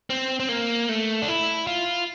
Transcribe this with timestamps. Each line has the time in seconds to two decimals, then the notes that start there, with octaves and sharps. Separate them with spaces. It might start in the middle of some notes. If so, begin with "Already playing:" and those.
0.10 C4
0.40 C4
0.49 A#3
0.89 A3
1.22 D4
1.28 E4
1.67 F4